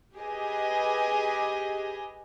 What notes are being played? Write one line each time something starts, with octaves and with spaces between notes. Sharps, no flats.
G4 G#4 B4 D#5